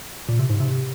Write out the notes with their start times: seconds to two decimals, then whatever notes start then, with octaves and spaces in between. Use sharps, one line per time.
0.29 A#2
0.39 C3
0.50 G#2
0.60 C3